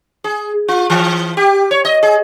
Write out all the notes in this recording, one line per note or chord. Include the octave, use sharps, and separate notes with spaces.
G#4
F4
E3
G4
C#5
D#5
G#4